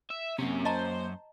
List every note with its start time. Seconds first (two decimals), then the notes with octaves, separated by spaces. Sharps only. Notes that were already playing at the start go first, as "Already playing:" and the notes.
0.10 E5
0.38 F#2 C3 A#3 C#4
0.65 C5 D#5 A5 A#5